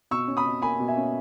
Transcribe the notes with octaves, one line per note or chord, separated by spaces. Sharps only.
B2 C#6 E6
C#4
B5 D#6
B2
A#3 G#5 B5
B2
E5 G#5
C#4